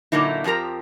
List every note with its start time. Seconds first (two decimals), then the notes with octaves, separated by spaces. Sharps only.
0.12 A#2 D3 F#3 A#3 D#4 E4
0.44 F2 F3 G4 A#4 A#5